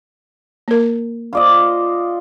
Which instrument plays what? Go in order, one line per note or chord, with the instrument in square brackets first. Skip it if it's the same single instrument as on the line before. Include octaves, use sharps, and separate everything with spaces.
[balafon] A#3 A#4
[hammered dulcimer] F4 D5 D#5